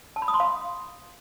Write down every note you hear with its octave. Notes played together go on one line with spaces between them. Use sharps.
A5
B5
D#6
C6
F5